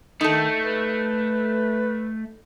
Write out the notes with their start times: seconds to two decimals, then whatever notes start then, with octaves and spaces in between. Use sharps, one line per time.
0.21 D#3 A3 D#4 A4
0.62 B4